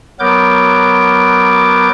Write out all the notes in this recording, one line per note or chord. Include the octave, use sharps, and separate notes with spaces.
F#3 B3 A#4 D6 G6